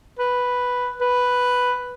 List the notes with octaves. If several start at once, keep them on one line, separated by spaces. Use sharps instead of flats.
B4
B4